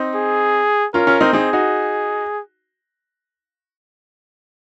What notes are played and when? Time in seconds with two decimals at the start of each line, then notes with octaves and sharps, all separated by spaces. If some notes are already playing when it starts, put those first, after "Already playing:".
Already playing: C4 D#4
0.15 G#4
0.94 C#4 F4 A#4
1.07 C#4 F4
1.21 C4 D#4
1.33 C4 D#4 G#4
1.53 D#4 F#4